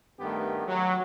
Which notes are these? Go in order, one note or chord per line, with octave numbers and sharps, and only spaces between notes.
G2 D#3 A3 B3 G4
F#3